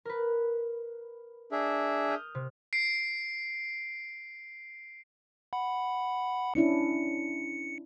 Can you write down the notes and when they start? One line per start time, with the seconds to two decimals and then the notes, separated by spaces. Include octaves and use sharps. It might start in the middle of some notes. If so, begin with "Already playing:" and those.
0.05 A#4 B4
1.52 D4 G#4 E5
2.08 D#6 F6 G6
2.35 C3
2.73 C7 D7
5.53 F#5 B5
6.55 C#4 D4 E4 C#7